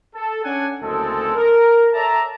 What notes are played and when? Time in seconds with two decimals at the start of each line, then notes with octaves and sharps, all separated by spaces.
0.14 A4
0.44 C#4 D4 F#5 G#5
0.82 F#1 D2 G#3 C4 A4
1.35 A#4
1.93 A4 C#5 D5 E5 A5 A#5